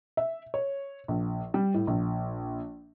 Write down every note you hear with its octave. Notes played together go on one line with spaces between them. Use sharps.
E5
C#5
A#1
G3
A2
A#1